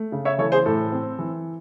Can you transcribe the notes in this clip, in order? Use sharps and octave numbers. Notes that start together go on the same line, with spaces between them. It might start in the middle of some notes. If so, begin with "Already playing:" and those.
Already playing: A3
C#3
C#5 E5
E3 A4 C#5
G#4 C5
A2 A4
C4
E3